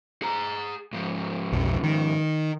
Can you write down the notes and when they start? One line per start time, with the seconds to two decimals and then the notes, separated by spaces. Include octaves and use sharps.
0.22 G#4 A#5
0.93 G#2 F3
1.52 B1 F2
1.83 D#3